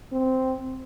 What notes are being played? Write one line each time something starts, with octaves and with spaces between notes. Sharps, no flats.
C4